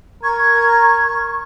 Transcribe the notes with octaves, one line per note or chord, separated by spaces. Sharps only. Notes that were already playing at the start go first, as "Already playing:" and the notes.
A#4 C#6 G#6